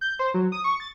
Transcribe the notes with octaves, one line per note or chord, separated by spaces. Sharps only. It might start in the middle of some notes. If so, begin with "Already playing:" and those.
G6
C5
F#3
D#6
C#6
A6